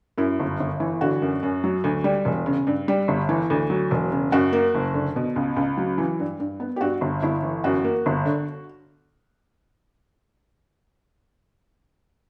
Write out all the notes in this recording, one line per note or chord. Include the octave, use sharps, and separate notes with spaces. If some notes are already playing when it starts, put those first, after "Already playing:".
F#2 E4
G1
G1
E3
D3 F#4
F#2
F#2
F#3
D2
G3
E1
C#3
G2
G3
G1
E3
D2
F#3
E1
C#3
F#2 F#4
A#3
F#1
D3
B2
C#2
C#2
F#3
E3
G2
G2
B3
G4
G2 F#4
G1
G1 E4
E3
F#2 F#4
A#3
G1
D3